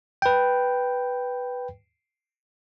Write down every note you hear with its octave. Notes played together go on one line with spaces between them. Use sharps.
B4 G5